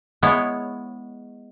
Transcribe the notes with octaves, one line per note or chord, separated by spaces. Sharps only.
G#3 B3 E4 C#5